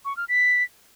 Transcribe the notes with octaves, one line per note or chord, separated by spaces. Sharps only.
C#6
F6
B6